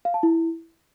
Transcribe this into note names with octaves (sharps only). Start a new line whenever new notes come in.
F5
A5
E4